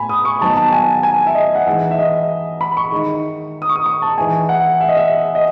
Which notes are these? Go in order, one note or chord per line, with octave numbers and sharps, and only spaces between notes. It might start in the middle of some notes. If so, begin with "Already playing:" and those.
Already playing: A2 B3 G#5 B5
D#6
C#6
D#3 F#3 B3 D#4 A5
A5
G#5
G#5
E5
D#5
F#5
E3 G#3 D#4 E5
E5
D#5
B5
C#6
D#3 G#3 D#4
D#6
C#6
D#6
C#6
A5
E3 G#3 D#4 G#5
F#5
E5
D#5
E5
D#5